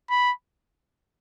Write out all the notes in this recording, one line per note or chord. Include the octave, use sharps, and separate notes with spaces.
B5